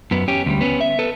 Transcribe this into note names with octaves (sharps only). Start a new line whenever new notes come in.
F#2 B3
C#4 G4
D2 G3
B3 C#4
E5
A4 B4